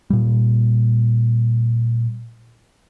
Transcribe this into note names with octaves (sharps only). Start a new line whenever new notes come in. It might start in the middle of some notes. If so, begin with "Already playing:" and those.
A#2 G3